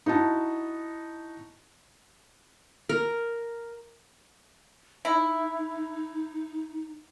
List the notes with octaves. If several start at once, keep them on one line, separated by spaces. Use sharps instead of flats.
D#4 E4 F#4 A5
A#4
D#4 E4